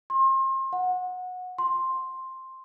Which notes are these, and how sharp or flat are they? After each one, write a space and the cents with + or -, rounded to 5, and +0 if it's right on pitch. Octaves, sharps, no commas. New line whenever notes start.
C6 +35
F#5 -20
C6 +5